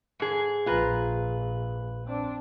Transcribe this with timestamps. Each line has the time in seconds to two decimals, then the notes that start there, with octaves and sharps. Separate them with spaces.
0.20 G#2 G#4
0.66 A#1 F4 B4 A#5
2.04 C4 D4